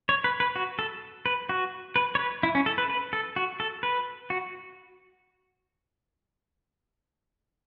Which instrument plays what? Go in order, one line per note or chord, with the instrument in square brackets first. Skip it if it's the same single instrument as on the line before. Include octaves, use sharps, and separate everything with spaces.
[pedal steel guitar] C#5
B4
B4
F#4
A4
B4
F#4
B4
C#5
B4
E4
C#4
A4
B4
B4
A4
F#4
A4
B4
F#4